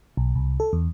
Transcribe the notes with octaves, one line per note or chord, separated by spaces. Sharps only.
B1
C2
A4
E2